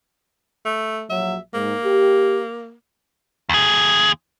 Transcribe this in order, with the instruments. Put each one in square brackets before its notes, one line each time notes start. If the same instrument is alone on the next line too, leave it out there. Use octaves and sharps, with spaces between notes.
[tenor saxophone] A3
[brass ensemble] A#1 F#3 [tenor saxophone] E5
[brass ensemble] G#2 [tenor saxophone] A#3
[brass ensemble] G4
[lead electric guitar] D#2 G#4